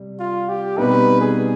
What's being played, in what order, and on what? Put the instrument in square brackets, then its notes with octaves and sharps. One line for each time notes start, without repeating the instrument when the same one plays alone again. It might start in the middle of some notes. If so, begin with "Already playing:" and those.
Already playing: [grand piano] C3 G3
[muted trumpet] F4
G4
[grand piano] B2 G3 C4 D#4 [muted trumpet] B4
[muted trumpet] G#4